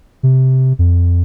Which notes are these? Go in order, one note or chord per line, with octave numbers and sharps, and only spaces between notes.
C3
F2